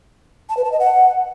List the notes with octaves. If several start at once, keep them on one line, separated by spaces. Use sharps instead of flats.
A5
B4
A5
D#5
F#5